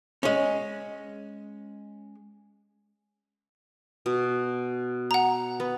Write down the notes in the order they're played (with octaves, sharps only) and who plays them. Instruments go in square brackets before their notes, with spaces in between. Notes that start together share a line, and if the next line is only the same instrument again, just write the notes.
[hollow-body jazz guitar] G#3 C#4
[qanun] B2
[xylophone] F#5 A#5
[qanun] B3